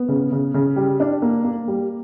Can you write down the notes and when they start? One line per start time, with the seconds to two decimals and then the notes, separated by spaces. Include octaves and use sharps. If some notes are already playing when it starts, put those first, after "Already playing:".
Already playing: B3
0.08 C#3
0.32 C#3
0.54 C#3
0.76 G3
1.00 D4
1.22 A#3
1.44 A#3
1.68 G3